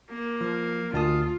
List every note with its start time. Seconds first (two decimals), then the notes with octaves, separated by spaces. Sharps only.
0.10 A#3
0.41 F3
0.94 D2 F4 A5 D#6